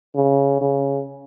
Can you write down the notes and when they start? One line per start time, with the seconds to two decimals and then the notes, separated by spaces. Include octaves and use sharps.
0.15 C#3
0.61 C#3